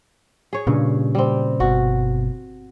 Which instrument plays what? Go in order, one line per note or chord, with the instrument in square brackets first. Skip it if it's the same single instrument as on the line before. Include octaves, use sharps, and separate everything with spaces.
[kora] G#4 C#5
[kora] G2 [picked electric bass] A#2 C#3
[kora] G3 C4
[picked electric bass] G1 B2 [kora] F#4